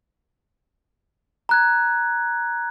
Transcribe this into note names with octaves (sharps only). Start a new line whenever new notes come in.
A#5 F#6 G#6